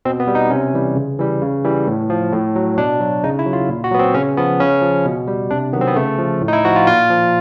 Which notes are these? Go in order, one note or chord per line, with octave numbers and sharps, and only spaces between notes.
B2 C4
B3
G3
D#4
C3 C#4
E3 G3
C#3
E3 G3
C#3
E3 G3
A2
F3
A2
F#3
B2 D4
F#3
C#3 D#4
E4
F#3
F4
A#2
F#4
F#3 B3
C4
C#3 C#4
F3 B3
C#3 C#4
F3
B2
G3
C3 D4
D#3 F#3 B3
C4
B3
C#3 A3
F3
A2
D#4
E4
F3 F#4
F4
A#2 F4
F3